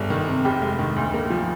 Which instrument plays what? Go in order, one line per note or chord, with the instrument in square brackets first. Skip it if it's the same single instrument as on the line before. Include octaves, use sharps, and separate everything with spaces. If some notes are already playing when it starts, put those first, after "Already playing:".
Already playing: [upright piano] G1 G3
D#3
C3
F1 G4
G#3
D#3
D2
A#3
F3